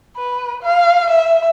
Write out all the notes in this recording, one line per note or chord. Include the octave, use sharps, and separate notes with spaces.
B4
F5
E5